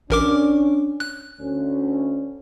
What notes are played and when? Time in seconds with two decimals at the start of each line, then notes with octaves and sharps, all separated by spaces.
0.10 A1 C#4 D4 A#4 D6
1.00 F#6
1.39 D2 C#4